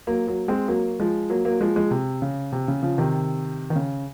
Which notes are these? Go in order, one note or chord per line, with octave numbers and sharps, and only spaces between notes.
F#3 A#3
F#3 A#3
G#3 C4
F#3 A#3
F3 G#3
F#3 A#3
F#3 A#3
F3 G#3
F3 G#3
C3
C#3
C3
C#3
C#3 F3
C3 D#3
D#3
C#3